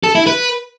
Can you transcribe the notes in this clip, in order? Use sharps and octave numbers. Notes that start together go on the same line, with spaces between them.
A4
E4
B4